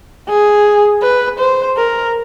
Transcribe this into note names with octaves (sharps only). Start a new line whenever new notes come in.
G#4
B4
C5
A#4